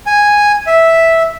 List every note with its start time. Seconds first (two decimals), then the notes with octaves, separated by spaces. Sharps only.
0.06 G#5
0.67 E5